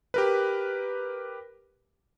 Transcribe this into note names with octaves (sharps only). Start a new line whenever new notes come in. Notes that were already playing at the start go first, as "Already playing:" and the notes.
G4 A#4 B4